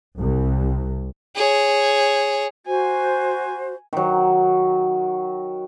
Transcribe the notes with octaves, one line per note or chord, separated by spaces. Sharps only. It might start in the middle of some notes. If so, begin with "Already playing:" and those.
C2
G#4 C#5
F#4 C5 G#5
D#3 F#3